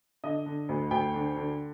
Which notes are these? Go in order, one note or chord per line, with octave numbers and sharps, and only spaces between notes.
D3 D#5
D3
D2
D2 G5
D3
D3